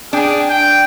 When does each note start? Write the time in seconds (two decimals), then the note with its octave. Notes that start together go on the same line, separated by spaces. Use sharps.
0.13 D4 G#4 G5
0.49 G5